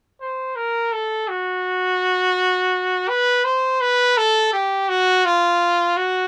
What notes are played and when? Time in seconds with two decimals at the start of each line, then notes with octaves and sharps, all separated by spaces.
0.21 C5
0.56 A#4
0.93 A4
1.28 F#4
3.09 B4
3.45 C5
3.81 B4
4.17 A4
4.53 G4
4.89 F#4
5.25 F4
5.97 F#4